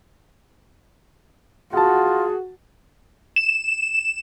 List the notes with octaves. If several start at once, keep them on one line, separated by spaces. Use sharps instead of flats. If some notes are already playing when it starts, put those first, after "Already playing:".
F4 F#4 G#4 F#5 A5
E7